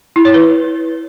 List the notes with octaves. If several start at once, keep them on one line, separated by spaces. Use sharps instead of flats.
E4
C#5
B4